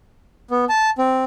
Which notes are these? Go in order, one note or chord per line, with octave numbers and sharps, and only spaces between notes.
B3
A5
C4